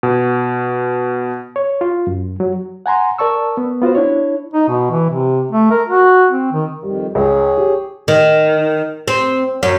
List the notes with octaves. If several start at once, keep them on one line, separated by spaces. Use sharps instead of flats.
B2
C#5
F4
F#2
F#3
F#5 G#5 A#5 C6
A#4 D5 A5 C#6 E6
B3
B3 F4 F#4 C5
D4 E4 C#5
D#4
B2
E3
C3
A3
A#4
F#4
C4
D#3
F2 D#3 G3
C#2 G#4 C#5
G4
D#3
C4
F#2